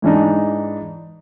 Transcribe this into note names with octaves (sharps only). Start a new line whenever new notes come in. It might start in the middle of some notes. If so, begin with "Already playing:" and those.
G#2 E3 D4 D#4